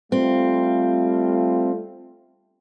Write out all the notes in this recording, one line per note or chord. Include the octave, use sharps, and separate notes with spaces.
G3 A3 C4 F4